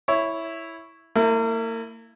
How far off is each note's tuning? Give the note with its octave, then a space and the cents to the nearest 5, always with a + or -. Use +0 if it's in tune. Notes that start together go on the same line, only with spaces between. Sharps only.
E4 +0 C#5 +0
A#3 -40 E4 +0